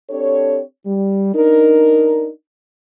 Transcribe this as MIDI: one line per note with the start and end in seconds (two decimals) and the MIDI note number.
0.10 0.61 60
0.10 0.61 62
0.10 0.61 67
0.10 0.61 69
0.10 0.61 73
0.86 1.31 55
1.34 2.29 62
1.34 2.29 63
1.34 2.29 70